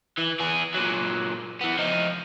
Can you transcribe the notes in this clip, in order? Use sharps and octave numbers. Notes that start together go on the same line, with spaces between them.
E3
E3 G#4
A#2 F#3
E3 B3
F3 D#4